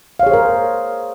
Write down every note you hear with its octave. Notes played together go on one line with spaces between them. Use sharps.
G#4 A#4 C5 C#5 F5